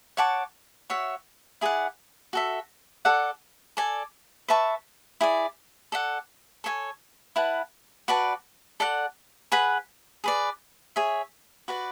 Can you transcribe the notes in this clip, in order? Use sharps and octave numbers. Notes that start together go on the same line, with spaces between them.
C#5 F#5 A5 D6
F#4 C#5 E5
E4 G#4 D5 F#5
F#4 A4 E5
A4 D5 F#5
A4 D5 G#5
B4 E5 A5 C#6
E4 G#4 D5
A4 D5 F#5
A4 C#5 E5 G#5
E4 B4 F#5 A5
F#4 B4 D5 A5
A4 D5 F#5
G#4 B4 F#5 B5
G#4 B4 D5
G#4 C#5 E5
F#4 B4 D5